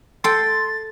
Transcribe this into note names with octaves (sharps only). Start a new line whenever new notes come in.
A4 G5 C6 A6